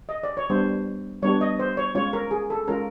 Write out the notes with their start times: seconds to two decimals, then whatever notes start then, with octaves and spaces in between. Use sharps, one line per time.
0.09 D#5
0.23 D5
0.37 C#5
0.50 G3 B3 D4 G4 C5
1.22 G3 B3 D4 G4 C#5
1.41 D#5
1.59 C5
1.77 C#5
1.95 G#3 C#4 F4 C#5
2.13 A#4
2.31 G#4
2.50 A4
2.68 G#3 C#4 F4 A#4